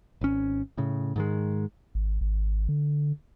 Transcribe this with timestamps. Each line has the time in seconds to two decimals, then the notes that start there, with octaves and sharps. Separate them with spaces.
0.21 G#1 C#4
0.78 A2 C#3
1.16 G#2 D#3 G#3
1.95 G#1
2.21 G#1
2.69 D3